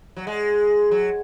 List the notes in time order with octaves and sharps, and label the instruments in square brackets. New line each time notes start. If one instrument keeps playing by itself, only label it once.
[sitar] F#3
G#3
F#3